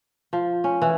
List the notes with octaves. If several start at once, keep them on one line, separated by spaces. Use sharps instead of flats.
F3
C#4
E3